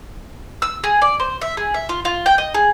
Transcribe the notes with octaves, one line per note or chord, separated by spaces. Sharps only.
E6
G#4
D5
C5
E5
G#4
E5
F4
F4
G5
D#5
G#4